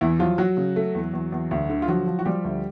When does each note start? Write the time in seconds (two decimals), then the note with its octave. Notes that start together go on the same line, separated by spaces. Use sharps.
0.01 E2 E3 E4
0.19 F3 F#3 F4
0.38 F#3 F#4
0.57 C#3
0.76 A3
0.95 E2
1.13 E2
1.32 E2
1.51 D2
1.70 D3
1.82 F4
1.88 F3 F#3 F#4
2.07 F3
2.19 F#4
2.25 F3 G3 G4
2.44 D2